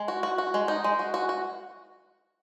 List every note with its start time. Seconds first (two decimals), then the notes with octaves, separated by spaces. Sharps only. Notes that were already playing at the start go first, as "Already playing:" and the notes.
Already playing: G#3
0.08 F#4
0.23 F#4
0.38 F#4
0.54 G#3
0.68 D#4
0.84 G#3
0.99 F#4
1.14 F#4
1.29 F#4